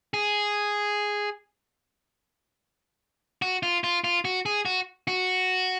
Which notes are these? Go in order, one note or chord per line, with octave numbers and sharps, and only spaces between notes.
G#4
F#4
F4
F4
F4
F#4
G#4
F#4
F#4